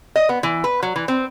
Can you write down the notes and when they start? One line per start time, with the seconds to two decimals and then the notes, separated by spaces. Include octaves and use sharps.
0.16 D#5
0.29 B3
0.43 E3
0.64 B4
0.83 F#3
0.96 E3
1.08 C4